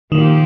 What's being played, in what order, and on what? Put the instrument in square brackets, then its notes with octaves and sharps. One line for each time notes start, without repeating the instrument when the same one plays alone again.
[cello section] A#2 F3 A#3 G4 [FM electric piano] D#3